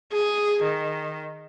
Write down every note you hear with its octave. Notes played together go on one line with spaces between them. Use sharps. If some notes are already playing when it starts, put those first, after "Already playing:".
G#4
D#3